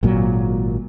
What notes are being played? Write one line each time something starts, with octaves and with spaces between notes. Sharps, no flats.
G#1 A#2 F#3